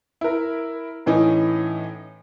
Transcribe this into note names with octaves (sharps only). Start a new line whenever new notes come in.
E4 A#4
A2 E3 C#4 D#4